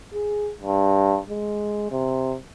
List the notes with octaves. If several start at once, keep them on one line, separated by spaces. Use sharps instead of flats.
G#4
G2
G#3
C3